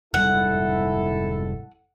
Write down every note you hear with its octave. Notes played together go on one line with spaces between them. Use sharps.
F1 G#2 G3 E4 A4 F#5